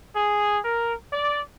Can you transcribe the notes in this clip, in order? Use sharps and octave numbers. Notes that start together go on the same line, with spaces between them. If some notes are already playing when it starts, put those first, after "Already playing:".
G#4
A#4
D5